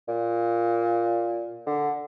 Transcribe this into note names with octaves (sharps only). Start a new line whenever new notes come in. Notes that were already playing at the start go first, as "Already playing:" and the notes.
A#2
D3